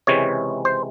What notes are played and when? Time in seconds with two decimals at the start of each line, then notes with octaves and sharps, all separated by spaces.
0.07 C#2 C3 E3 G#3 C#5
0.65 C5